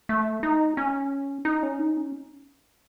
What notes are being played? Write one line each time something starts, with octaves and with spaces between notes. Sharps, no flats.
A3
D#4
C#4
D#4
C#4
D#4
C#4